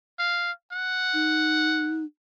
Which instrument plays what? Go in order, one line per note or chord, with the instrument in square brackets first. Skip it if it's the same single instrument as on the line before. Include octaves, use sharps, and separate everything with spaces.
[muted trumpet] F5
F#5
[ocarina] D#4